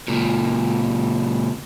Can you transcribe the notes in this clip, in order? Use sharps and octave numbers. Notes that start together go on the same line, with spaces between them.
C#2 A#2